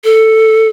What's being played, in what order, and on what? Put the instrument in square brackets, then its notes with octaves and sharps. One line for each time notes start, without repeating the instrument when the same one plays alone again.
[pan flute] A4